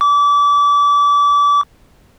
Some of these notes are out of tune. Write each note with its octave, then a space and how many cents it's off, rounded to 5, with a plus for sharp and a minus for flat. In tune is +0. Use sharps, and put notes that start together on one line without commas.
D6 -30